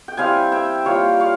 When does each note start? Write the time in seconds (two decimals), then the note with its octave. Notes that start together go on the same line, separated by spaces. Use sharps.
0.08 G5
0.17 G3 C4 E4 F5 G#5
0.52 E5 G5
0.86 G3 A#3 F4 C#5 F5
1.20 C#5 F5